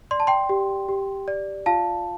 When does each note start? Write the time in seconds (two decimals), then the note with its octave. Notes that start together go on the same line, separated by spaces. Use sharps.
0.11 D5 C6
0.20 A5
0.27 G5 C6
0.49 G4
0.89 G4
1.28 D5
1.66 F4 F5 A5